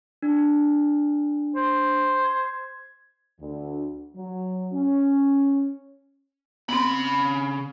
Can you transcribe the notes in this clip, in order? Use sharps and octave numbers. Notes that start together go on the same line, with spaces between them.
D4
C5
G#6
D2
F#3
C#4
C#3 B3 C4 B5